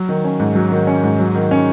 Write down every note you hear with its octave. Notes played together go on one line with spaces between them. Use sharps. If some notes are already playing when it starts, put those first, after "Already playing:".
Already playing: F#3
D#3
C#4
G#2
F#3
D#3
C#4
G#2
F#3
D#3
C#4